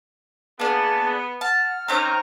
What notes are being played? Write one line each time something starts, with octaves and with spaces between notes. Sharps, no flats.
A#3 B3 D4 G#4 A5
F#5 A5 F6
D#3 C4 C#4 C5 C#5 A#5 D6